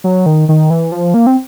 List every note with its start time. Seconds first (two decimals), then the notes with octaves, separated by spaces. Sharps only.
0.04 F#3
0.26 D#3
0.49 D#3
0.70 E3
0.92 F3
1.14 A#3
1.27 C4